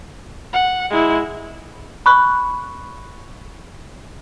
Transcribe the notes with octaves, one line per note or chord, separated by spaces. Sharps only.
F#5
G#3 E4
B5 C#6 F#6